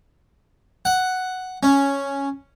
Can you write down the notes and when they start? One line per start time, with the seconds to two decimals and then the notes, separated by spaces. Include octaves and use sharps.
0.85 F#5
1.63 C#4